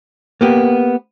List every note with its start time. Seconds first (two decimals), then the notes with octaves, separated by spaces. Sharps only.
0.41 A#3 B3 G4